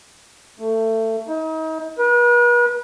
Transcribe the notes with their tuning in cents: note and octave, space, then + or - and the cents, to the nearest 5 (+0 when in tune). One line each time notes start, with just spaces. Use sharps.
A3 +25
D#4 +35
B4 -40